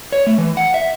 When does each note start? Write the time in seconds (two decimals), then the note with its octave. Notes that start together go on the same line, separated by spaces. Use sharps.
0.12 C#5
0.27 A3
0.38 E3
0.57 F#5
0.74 E5